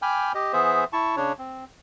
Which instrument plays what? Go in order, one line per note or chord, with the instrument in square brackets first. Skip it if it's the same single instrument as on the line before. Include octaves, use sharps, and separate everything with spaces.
[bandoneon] G5 G#5 B5 D6 F6 G6
G4 D#5
E3 B3 G#4 C5 E5
E4 A5 C#6
C#3 D4 C#5
C4